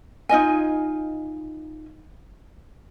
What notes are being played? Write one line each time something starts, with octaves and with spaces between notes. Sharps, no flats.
D#4 F4 D#5 G#5